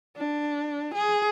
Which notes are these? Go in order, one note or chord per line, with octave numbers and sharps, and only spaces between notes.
D4
G#4